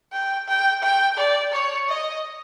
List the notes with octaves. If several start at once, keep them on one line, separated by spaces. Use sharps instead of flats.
G5
G5
G5
D5
C#5
D#5